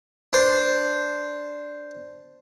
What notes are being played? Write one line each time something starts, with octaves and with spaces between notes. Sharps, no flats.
D4 C5